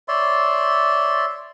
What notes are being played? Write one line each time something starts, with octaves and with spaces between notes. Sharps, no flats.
C#5 D5 E5 C6